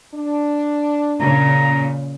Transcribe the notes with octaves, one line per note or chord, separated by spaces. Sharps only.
D4
A#2 C#3 A#5